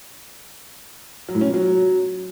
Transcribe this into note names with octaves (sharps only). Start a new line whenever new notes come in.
F#3
A2
C#4
A#2
F#3